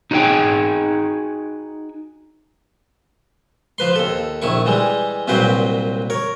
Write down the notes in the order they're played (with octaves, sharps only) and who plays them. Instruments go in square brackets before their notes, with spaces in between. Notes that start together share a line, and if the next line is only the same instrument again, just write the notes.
[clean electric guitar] D#4 F#4 G#4 B4 G5 G#5
[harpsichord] F3 B4 C6
D#2 A4
A#1 D#3 E4 C#6
E3 G3 G#3
C2 A#2 F#3 G4 B4 C5
A#4 C#5